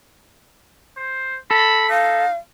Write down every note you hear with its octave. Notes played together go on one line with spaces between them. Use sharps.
C5
A4 B5
D#4 F5